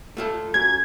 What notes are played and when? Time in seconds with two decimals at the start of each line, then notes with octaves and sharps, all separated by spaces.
0.17 A3 F4 A4
0.54 F#2 G#6